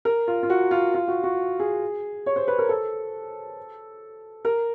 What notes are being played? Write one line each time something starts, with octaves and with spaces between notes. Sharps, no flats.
A#4
F4
F4
F#4
F4
F4
F#4
F#4
G#4
C#5
C5
B4
A#4
A4
A#4